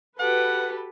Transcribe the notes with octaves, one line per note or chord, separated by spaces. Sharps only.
F#4 G4 A4 B4 F#5